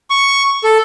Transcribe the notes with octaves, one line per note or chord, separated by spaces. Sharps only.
C#6
A4